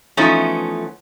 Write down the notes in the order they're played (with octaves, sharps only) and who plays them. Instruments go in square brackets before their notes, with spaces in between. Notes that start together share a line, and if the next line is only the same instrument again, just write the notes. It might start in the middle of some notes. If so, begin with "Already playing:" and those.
[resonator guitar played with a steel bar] E3 F3 A3 B3 C#4 D#4